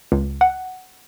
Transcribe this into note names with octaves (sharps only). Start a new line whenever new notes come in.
C#2
F#5